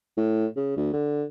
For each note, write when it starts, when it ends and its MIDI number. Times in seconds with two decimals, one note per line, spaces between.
0.17 0.46 45
0.56 0.74 49
0.77 0.91 38
0.93 1.24 50